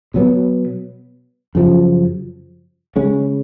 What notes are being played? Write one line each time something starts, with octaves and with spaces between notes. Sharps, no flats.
B2 F#3 B3
F#2 C#3 F3
C#3 G#3 C#4